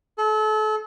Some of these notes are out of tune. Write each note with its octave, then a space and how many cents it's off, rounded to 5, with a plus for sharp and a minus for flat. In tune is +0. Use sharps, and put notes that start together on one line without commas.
A4 -35